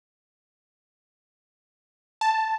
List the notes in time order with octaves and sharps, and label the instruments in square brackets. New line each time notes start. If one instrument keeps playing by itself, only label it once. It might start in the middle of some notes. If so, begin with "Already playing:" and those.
[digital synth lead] A5